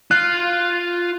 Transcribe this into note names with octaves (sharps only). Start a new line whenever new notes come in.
F4 F5 F#6